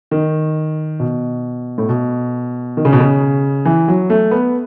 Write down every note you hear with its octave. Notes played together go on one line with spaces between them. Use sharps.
D#3
B2
A2
B2
D#3
C#3
B2
C#3
E3
F#3
A3
B3